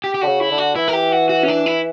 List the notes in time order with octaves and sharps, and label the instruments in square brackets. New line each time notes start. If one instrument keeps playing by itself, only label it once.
[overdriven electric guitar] G4
G4
[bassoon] D3 [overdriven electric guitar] F#4
[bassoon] C#3
[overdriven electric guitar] E4
[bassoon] D3
[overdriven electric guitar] F#4
[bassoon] E3 [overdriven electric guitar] E4
[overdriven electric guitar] A#4
G4
F#4
F#4
C#4
D4
E4